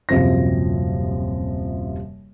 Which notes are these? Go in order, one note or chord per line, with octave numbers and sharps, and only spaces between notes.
D#1 F#2 C3 F3 C4 A#6